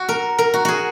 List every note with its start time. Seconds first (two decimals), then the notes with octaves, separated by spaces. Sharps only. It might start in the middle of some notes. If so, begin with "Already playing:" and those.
Already playing: F#4
0.09 A#4
0.38 A#4
0.54 F#4
0.65 F#4 G#4